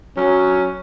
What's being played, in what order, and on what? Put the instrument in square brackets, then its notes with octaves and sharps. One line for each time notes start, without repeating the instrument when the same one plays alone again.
[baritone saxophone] F#3 [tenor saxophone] C#4